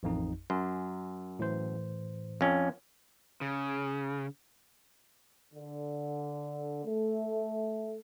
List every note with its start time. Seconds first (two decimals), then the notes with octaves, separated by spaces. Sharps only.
0.03 A1 F2 D#4
0.50 F#2 C6
1.39 A2 E3 C5
2.41 F2 C#4
3.41 C#3
5.54 D3
6.86 A3